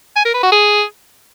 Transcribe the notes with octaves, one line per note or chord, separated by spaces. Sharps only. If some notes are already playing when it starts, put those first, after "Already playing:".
G#5
A#4
B4
F#4
G#4